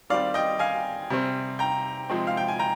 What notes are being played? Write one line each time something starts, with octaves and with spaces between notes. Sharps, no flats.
D#3 G3 C4 D5 F5
D#5 G5
F5 G#5
C3 G3 C4
G5 A#5
C3 F3 G#3 C4
F5
G5
G#5
G5 A#5